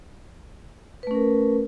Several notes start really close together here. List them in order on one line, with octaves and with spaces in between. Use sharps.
B4 A3 C#4 A#4